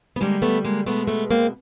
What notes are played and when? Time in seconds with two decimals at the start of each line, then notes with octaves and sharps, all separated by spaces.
0.16 B3
0.20 D3 G3 G#3 A#3
0.42 A3 B3
0.64 G#3 A#3
0.86 B2 G#3 A3 B3
1.08 A3 B3
1.31 A#3 C4